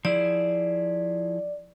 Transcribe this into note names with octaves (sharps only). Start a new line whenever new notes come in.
F3 E4 G#4 D5